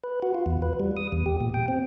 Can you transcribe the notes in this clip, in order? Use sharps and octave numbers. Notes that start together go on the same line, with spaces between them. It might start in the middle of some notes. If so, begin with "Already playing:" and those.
B4
F#4
F4
E2
B4
G3
D#6
E2
G4
A#2
G5
C4